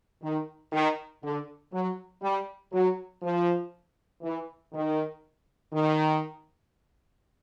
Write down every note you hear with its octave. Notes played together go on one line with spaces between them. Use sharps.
D#3
D#3
D3
F#3
G3
F#3
F3
E3
D#3
D#3